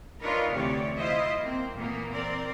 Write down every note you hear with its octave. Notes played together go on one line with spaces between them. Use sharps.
D4 D#4 F4 A#4 B4 C#5
D2 C3 E3 G4 C#5 D5
E4 F4 C5 D#5 E5
A#3 C4
A#2 E3 A#3 B3
C4 A#4 D5